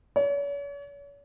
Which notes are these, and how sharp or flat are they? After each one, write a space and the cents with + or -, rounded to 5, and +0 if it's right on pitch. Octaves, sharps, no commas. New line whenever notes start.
C#5 +40